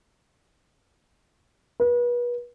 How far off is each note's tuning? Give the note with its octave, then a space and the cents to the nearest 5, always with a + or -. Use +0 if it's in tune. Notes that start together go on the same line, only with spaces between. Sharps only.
B4 -35